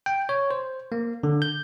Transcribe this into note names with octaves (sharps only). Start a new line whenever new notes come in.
G5
C#5
C5
A#3
D3
G6